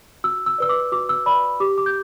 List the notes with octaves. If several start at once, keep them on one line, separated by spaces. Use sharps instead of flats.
F#4 E6
E6
B4 D5 E6
D6
F#4 D6
E6
B4 D5 B5
G4 D6
D6
G6